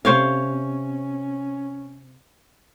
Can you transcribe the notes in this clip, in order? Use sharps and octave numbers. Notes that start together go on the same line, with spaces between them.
C3 C#4 C5 C#5 F5